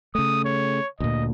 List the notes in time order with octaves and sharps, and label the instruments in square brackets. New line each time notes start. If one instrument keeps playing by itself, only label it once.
[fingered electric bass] C#3 A3 [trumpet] D#6
[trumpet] C#5
[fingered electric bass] D2 A#2 [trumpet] D#5